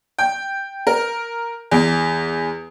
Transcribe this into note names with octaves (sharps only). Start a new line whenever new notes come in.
G5
A#4
E2